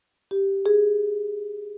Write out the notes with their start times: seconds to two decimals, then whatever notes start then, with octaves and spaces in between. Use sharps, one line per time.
0.31 G4
0.66 G#4